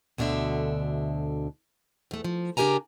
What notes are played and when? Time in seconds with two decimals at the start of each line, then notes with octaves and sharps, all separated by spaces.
0.18 D2 B2 D3 D4 E5
2.11 E2 A3
2.24 F3
2.57 C#3 D4 G4 A#4 G#5 A#5